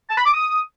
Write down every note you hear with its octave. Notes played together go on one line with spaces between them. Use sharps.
A5
B5
D6
D#6